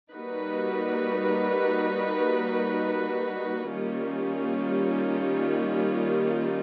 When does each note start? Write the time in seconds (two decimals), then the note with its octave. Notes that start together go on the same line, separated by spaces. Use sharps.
0.13 G3 A#3 D#4 F#4 B4
3.71 D#3 G3 A#3 C#4 F4